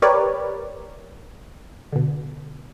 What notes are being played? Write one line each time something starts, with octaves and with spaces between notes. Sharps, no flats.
G4 A#4 B4 C#5 D5
B2 D3